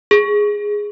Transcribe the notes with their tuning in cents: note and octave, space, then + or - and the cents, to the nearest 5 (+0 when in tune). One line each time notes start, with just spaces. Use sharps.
G#4 -5